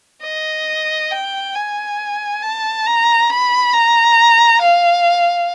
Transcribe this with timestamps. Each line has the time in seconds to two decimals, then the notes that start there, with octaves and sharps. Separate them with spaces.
0.23 D#5
1.11 G5
1.55 G#5
2.42 A5
2.86 A#5
3.29 B5
3.73 A#5
4.61 F5